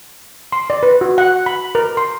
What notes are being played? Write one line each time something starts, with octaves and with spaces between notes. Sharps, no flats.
C6
D5
B4
F#4
F#5
B5
A#4
C6